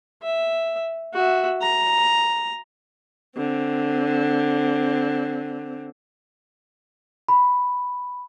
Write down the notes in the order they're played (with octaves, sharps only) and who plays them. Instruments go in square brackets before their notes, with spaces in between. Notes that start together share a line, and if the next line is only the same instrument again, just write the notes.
[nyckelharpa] E5
F#4 E5
A#5
[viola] D3 C4
[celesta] B5